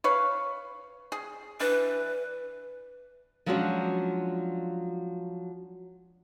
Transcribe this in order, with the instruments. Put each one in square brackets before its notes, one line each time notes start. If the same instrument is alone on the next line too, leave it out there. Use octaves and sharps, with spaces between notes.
[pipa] B4 C#5 F5
G#4
[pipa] E3 D4 [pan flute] B4
[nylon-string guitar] F3 F#3 G#3 C#4 D4 F#4